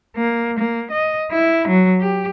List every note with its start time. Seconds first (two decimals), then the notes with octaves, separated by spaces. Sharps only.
0.16 A#3
0.59 A#3
0.91 D#5
1.31 E4
1.68 F#3
2.00 G4